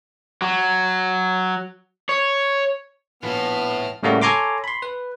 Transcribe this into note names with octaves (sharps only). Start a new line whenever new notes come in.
F#3
C#5
A#1 A2 B3 F4 B4 A5 F6
A2 C#3 G3 A3 A#3 F#4
A4 C#5 G#5 A#5 C6 D6
B5 C6
B4